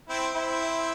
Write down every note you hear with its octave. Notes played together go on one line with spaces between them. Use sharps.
C4 E4
C4 E4